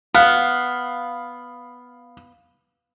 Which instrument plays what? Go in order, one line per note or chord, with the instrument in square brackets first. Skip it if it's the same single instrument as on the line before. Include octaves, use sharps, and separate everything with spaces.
[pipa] B3 [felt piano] F5